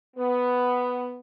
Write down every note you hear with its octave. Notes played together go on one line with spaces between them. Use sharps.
B3